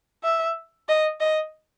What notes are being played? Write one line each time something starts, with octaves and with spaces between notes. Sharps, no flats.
E5
D#5
D#5